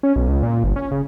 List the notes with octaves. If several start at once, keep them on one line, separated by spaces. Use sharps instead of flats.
C#4
B1
C#2
A#2
G1
C#4
C#3